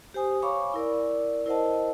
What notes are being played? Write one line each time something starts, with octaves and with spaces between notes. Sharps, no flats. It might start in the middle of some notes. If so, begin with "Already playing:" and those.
G4 C5 G#5 D#6
C#5 F5 G#5 B5 C#6 D6
E4 A#4 D5
E4 A#4 C5 D#5 F#5 A5